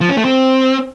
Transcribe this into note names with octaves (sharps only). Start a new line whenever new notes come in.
F3
C#4
A3
C4